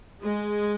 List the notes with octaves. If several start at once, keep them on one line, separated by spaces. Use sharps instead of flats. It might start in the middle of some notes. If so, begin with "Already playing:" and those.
G#3